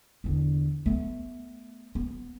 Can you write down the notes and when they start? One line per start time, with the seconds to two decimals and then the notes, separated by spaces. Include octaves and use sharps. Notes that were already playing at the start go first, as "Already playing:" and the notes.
0.24 E2 D3
0.86 A3 B3
1.95 B3